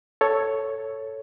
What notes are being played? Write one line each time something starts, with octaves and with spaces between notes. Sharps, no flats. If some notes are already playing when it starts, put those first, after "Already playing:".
A4 C#5